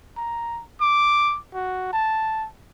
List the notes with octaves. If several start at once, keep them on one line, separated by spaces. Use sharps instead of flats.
A#5
D6
F#4
A5